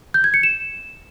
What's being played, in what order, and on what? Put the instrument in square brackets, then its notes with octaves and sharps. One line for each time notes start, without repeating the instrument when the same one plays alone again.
[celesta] G6
G#6
C#7
E7